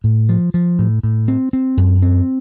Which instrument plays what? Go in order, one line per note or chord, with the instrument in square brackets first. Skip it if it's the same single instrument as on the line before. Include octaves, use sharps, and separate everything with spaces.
[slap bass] A2
F3
F3
A2
A2
C4
C4
F#2
C4